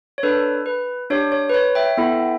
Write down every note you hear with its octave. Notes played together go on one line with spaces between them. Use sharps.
C#5
D4 A4 B4
B4
D4 G4 C#5
C#5
B4
C#5
E5 G5
B3 E4 A4